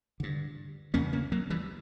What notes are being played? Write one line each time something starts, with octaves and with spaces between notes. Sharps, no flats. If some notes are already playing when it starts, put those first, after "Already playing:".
G2 D3
E2 C#3 A#3 C#4
A#3 C#4
F#3 A#3
E3 G3